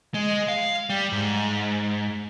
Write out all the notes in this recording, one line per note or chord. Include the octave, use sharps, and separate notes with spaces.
G#3
F5
G3
G#2